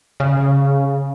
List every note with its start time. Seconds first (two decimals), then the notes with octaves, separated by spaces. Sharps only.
0.20 C#3